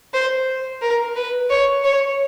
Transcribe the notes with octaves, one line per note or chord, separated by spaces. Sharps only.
C5
A#4
B4
C#5
C#5